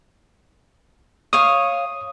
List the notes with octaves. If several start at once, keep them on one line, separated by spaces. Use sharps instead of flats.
C#5 F5 D#6